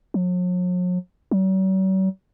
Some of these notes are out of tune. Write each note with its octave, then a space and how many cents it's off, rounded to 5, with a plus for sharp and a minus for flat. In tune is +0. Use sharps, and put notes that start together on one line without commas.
F#3 -45
F#3 +45